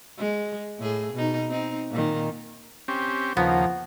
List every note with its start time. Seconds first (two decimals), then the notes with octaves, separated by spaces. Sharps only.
0.18 G#3
0.79 A2 G#4
1.14 B2 D#4
1.49 C4 D#4
1.90 A#2 D#3
2.88 C4 C#4 G4
3.37 D#2 C#3 F3 A#3 B3